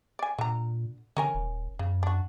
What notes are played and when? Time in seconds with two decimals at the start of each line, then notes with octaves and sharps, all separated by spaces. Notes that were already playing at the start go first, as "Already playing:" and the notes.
0.19 D5 G#5
0.38 A#2 D3 A#5
1.17 D3 C#4 A#4 G#5
1.35 D#1
1.79 F#2 C#3
2.03 D4 F#4